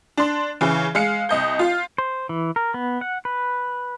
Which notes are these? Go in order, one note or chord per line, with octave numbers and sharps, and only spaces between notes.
D4 C6
C#3 E3
G#3 F5 C#7
C2 D#5 G6
F4 F5
C5
E3
A#4
B3
F#5
B4